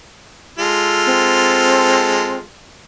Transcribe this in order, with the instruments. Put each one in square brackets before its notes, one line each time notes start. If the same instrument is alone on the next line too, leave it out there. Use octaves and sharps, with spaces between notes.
[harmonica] G#3 F4 A4
[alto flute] C4